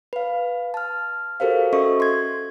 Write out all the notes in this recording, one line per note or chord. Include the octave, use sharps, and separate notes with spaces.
B4 F5
A5 F6
F#4 G4 A4 A#4 C5 F5
C#4 F#4 A4 D#5 E5 C#6
C6 G#6